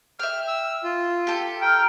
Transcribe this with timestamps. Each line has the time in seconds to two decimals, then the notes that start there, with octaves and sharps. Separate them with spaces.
0.19 E5 G5 F6
0.48 E6
0.84 F4
1.27 G4 A4
1.62 G5 A#5 F6